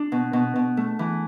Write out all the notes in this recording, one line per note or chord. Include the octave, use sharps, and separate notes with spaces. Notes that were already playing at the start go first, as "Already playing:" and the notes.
Already playing: D4
B2
B2
B2
A3
E3